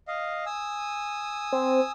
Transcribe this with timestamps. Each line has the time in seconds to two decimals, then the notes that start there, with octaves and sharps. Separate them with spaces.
0.08 D#5 F5
0.46 G#5 D#6 E6
1.52 C4